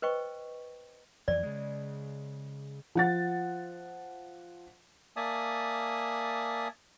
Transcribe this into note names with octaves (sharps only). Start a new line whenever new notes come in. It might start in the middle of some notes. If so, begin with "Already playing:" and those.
B4 C5 D#5 G5 C#6
F2 E3 F#3 D5
C#3 G#3
F3 F#5 A6
A#3 D5 E5 G#5 A5 D#6